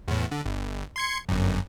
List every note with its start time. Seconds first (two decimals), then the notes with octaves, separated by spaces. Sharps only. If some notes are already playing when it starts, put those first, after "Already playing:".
0.08 E2 A2
0.31 D3
0.46 G1
0.96 C6 G#6 C#7
1.29 G1 F#2